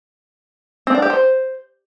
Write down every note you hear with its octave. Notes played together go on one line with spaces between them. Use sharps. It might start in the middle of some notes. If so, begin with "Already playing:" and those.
C4
D4
G4
C5